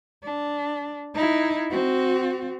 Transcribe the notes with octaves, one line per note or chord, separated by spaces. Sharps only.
D4
D#4 E4
C4 F#4